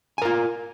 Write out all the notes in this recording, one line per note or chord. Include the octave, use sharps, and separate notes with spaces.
F4 A#4 G#5